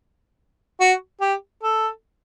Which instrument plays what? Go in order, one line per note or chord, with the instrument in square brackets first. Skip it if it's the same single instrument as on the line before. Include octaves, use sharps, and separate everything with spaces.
[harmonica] F#4
G4
A4